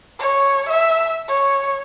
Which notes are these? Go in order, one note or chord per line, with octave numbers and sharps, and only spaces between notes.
C#5
E5
C#5